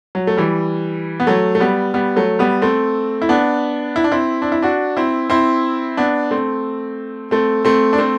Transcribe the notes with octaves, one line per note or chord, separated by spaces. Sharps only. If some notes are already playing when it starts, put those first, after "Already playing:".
F#3
A3
E3 G3
B3
F#3 A3
A3
G3 B3
G3 B3
F#3 A3
G3 B3
A3 C4
E4
B3 D4
E4
D4
C4 E4
D4
E4
D4 F#4
C4 E4
C4 E4
B3 D4
A3 C4
A3 C4
A3 C4
D4
A3 C4